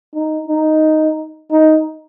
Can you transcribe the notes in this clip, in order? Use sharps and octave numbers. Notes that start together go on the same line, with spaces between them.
D#4
D#4
D#4